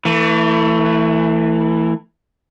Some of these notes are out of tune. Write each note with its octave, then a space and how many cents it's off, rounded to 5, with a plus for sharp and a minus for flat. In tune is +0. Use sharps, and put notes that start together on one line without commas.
E3 +0 A3 +30